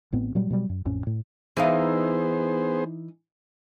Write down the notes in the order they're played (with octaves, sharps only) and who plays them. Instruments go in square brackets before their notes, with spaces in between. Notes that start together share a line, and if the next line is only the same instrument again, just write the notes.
[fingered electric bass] A1 A2 B3 C4
A#2 F#3 G3
B2 F#3 G3
F#2
A1 F2 A2 C#4
A2
[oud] E3 D#4 F5 [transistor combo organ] B3 G#4 C5